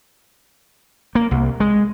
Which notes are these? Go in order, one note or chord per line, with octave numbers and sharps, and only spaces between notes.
A#3
C2
G#3